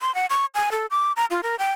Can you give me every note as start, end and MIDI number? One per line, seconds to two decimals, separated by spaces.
0.01 0.14 84
0.15 0.26 78
0.30 0.46 85
0.55 0.70 80
0.72 0.86 69
0.91 1.12 86
1.16 1.25 82
1.31 1.41 65
1.43 1.56 70
1.59 1.73 79